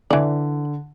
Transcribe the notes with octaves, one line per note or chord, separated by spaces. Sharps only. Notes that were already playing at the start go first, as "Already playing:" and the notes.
D3 E3 D5